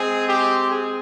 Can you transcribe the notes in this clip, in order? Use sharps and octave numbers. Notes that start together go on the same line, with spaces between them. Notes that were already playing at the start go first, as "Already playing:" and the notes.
Already playing: G#3 C4 G#4
G4
G#4